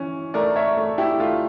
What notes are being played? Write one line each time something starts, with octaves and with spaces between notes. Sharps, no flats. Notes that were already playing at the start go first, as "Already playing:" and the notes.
Already playing: E3 C#4
A3 A#4 D5
C#5 E5
A3
E4 G4
A3 F4